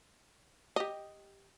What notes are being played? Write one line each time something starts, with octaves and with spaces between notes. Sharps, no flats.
G4 D#5